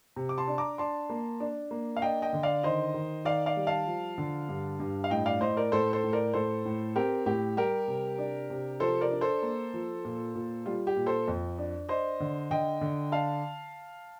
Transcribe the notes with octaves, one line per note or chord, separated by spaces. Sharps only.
C3
D6
A5 C6
D4
A#5 D6
D4 A5 C6
A#3
D4
A#3
F5
D4 D#5 G5
D#5 G5
D3
D5 F5
D#3 C5 D#5
D#3
D#3 D5 F5
D5 F5
G3
F5 A5
F3
D3
G2
G2
F5
A2 D#5 G5
D5 F5
A2 C5 D#5
A#4 D5
A2 A4 C5
A4 C5
A2
A#4 D5
A2 A4 C5
A2
C4 G4 A#4
A2 G4
G3 G4 A#4
C3
D4
C3
F3 A4 C5
A#4 D5
D4
A4 C5
A#3
F3
A#2
A#2
G3 F4
G4
A#2
A4 C5
F2
D4
D4 C5 D#5
D3
D3 D#5 G5
D3
D4 F5 A5